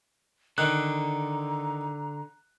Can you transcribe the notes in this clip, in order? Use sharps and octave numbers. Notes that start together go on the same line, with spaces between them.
D3 D#3 A#5 F#6